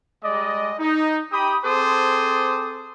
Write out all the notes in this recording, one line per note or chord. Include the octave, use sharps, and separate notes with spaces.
G3 G#3 D5 D#5
D#4
G4 G5 B5 D#6
C4 G#4 A4 C5 D6 D#6